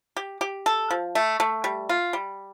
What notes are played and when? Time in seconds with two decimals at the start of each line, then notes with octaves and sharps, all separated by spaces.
0.17 G4
0.41 G4
0.66 A4
0.91 F3
1.15 A3
1.40 A3
1.64 G3
1.89 F4
2.13 G3